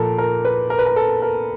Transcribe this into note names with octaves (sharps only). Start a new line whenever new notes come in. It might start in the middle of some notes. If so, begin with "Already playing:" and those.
Already playing: A#2 F3 A4 A#4
A#4
B4
A#4
B4
A#4
A4
A#4